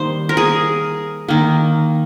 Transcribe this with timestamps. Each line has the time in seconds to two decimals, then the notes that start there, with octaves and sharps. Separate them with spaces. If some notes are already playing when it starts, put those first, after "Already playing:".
Already playing: D#3 G3 A#3 C5
0.29 A#4
0.37 G#4
1.28 D#3 A#3